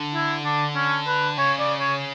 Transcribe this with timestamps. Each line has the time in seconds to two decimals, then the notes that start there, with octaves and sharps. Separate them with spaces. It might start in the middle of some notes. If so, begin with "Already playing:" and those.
Already playing: D3
0.14 E4
0.45 D4
0.75 C#4
1.07 B4
1.38 C#3 C#5
1.59 D5
1.80 C#5